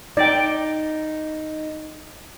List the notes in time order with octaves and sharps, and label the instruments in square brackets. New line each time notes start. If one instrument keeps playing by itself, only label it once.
[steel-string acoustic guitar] D#4 [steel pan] D5 G5